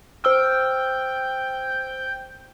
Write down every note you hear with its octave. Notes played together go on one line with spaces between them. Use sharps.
C5 G5 E6 F6